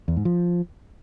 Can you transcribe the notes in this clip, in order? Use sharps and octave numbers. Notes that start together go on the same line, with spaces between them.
E2
G#2
F3